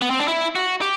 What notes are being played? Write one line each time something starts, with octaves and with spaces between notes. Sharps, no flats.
B3
C4
D4
E4
F#4
G4